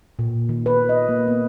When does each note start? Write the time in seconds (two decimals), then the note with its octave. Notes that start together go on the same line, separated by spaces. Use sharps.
0.19 A#2
0.49 D#3
0.66 B4
0.89 D#5
1.09 A#3
1.28 B3